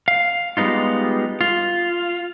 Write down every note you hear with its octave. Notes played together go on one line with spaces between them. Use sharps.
F5
G3 G#3 B3 D#4 F4
F4